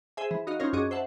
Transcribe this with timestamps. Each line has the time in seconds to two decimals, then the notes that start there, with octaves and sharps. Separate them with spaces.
0.17 G#4 C5 E5 G#5
0.31 E3
0.47 D#4 F#4 D#5 F5
0.59 C4 C#4 D#4 F4 A#4 C#5
0.73 F#2 C#4 F#4 G#4 D#5 D6
0.91 C5 E5 F#5 A5